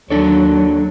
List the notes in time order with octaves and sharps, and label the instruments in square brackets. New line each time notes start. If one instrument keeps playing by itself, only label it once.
[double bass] D#2 F#3 [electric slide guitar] D4 A4 C#5